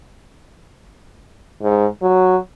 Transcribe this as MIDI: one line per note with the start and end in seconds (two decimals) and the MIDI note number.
1.63 1.86 44
2.02 2.37 54